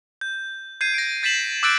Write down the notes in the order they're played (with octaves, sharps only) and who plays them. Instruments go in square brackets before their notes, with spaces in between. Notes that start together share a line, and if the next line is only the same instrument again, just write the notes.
[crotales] G6
G6 G#6 C7 D#7
A#6 D7
G6 A6 B6 C7 E7 F#7
D6 E6 F#6 G6 A6 D7